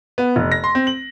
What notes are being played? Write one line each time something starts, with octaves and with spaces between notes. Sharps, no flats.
B3
F1
A#6
C6
C4
F#7